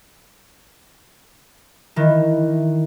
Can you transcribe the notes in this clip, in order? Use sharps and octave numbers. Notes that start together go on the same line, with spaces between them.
D#3 E3